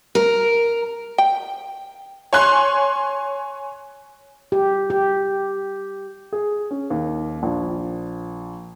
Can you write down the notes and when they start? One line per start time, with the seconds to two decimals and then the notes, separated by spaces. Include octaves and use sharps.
0.15 A#4
1.18 G5
2.33 C#5 G#5 C6 F#6
4.52 G4
4.90 G4
6.33 G#4
6.71 C#4
6.90 D#2
7.43 A#1